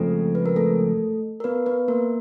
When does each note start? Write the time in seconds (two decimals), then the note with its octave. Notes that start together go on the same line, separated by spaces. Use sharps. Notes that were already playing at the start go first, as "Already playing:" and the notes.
Already playing: F2 C#3 F3 G#3 A3 C4 A4
0.35 B4
0.46 A#4
0.56 A3 A4
1.40 A#4
1.44 B3 B4
1.66 B3 B4
1.88 A#3 A#4